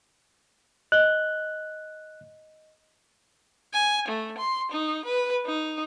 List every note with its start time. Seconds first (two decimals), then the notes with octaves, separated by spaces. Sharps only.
0.92 D#5 F#6 G7
3.73 G#5
4.08 A3
4.38 C6
4.72 D#4
5.05 B4
5.46 D#4